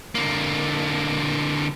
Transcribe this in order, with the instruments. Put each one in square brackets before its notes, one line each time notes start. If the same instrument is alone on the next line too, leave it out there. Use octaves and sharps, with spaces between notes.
[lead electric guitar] D3 A#3